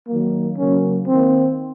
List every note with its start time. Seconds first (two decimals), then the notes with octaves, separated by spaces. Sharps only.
0.08 D#3 F#3 A#3
0.58 C#3 F#3 A#3 C#4
1.07 D#3 A#3 C4